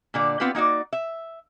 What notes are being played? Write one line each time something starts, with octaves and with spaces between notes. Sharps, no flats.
A#2 D3 D5
B3 C4 F4 G4 B4
A#3 D#4 F#4 D5
E5